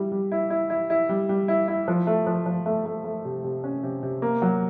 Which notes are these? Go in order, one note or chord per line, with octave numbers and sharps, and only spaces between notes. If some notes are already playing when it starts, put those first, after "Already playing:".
Already playing: G3 E4
G3
E4
E4
E4
E4
G3
G3
E4
E4
F3
A3
F3
F3
A3
A3
A3
C3
C3
C#4
C3
C3
A#3
F#3